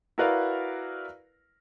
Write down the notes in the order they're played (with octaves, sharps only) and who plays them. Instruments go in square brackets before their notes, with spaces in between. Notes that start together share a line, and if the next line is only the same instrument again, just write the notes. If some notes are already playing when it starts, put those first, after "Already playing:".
[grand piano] E4 F#4 A#4 B4 D5 F5